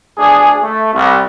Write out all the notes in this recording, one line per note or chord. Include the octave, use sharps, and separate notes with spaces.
D2 D4 G#4
A3
C2